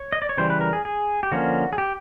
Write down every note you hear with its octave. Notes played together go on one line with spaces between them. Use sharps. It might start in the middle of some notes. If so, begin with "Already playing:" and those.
Already playing: C#5
D#5
D5
C#5
C#3 E3 G3 C5
B4
A#4
G#4
G#4
G4
D3 F3 A#3 C#4 F#4
G#4
G4